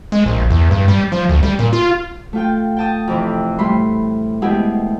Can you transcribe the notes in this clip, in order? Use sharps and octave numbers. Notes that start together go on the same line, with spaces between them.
G#3
A#1
E2
G2
G3
F3
D2
G3
A#2
F4
A3 F4 G5
G5 A5 D#6
F2 C3 E3
A2 G3 A3 B5 C6
B2 G#3 A3 E4 G4 G#4